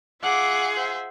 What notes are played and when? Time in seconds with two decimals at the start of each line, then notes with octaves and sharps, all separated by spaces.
0.23 F4 G#4 E5 F#5 D6
0.77 C5 E5